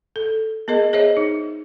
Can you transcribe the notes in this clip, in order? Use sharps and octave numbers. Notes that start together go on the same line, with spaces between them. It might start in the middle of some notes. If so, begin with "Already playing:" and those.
A4
B3 G#4 A#4 D#5
G#4 C5 C#5 D#5 E5
D#4